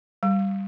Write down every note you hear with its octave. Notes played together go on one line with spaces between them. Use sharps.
G3